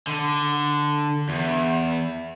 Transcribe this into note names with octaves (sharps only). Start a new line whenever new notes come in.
D3
E2